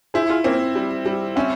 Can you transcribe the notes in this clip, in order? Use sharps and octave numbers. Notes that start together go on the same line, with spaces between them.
E4 G#4 C5
F4 G#4
A#3 C4 C#4
G3
G3
C4 C#4 E4